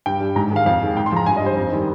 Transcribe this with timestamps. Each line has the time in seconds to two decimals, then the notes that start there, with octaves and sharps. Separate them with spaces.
0.06 G2 G5
0.20 G3
0.36 G#2 A#5
0.51 D#3 G#3 F5
0.66 F2 F5
0.82 D#3 G#3
0.97 G#2 G5
1.06 C6
1.12 F3 G#3 A#5
1.26 G2 G#5
1.37 D#5
1.42 G3 C5
1.57 F2
1.72 D#3 G3